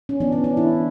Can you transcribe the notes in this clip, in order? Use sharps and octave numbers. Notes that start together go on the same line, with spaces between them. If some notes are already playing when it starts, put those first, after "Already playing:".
C#4
E3 B3 D4
C#4
D4
E4